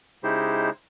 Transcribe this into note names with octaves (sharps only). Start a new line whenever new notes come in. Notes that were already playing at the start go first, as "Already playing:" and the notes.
C#3 G#3 D#4 E4 G4 C5